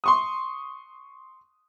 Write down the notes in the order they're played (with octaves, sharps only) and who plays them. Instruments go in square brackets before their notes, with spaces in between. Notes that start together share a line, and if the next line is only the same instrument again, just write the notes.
[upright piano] C6 C#6 D#6